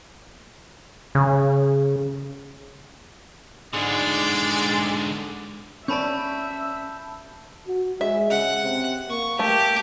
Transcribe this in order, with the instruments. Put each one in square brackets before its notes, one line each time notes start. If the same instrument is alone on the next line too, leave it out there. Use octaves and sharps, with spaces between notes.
[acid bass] C#3
[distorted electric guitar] G#2 D3 [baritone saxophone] G#3 [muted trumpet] D5
[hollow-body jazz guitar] C#4 B4 D5 [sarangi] E5 [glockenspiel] A5 B5 G6
[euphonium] F#4
[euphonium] G#3 [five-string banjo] E5
[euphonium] C#3 [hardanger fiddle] F#5
[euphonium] C3
[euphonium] A#3 [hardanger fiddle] C#6
[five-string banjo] A3 [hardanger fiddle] G4